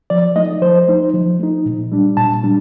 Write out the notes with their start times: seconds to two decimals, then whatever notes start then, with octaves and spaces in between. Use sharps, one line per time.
0.10 F3 D5
0.36 A3 D#4 D#5
0.62 F3 C5
0.88 A3 D#4
1.14 F3
1.39 A3 D#4
1.66 A#2
1.92 G3 D4
2.17 A#2 A5
2.43 G3 D4